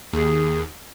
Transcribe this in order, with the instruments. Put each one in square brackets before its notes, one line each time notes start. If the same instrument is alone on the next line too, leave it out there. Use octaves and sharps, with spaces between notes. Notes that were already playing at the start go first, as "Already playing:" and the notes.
[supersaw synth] D#2 [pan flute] G#4